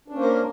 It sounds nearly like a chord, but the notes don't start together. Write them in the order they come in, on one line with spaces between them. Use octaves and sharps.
D4 C#4 A#3 C5 A#4